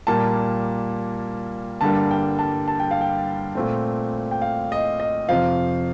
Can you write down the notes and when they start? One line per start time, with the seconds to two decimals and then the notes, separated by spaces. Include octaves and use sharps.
0.07 A#2 G3 A#3 A5
1.81 G2 D3 G3 A#3 A5
2.11 G5
2.39 A5
2.68 A5
2.80 G5
2.91 F5
3.01 G5
3.55 A#2 A3 C4
4.31 G5
4.42 F5
4.72 D#5
5.00 D#5
5.29 F2 C3 F3 F5